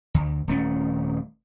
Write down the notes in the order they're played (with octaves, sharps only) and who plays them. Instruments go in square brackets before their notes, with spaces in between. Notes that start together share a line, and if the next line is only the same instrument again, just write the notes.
[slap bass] D2
D#1 A3 C#4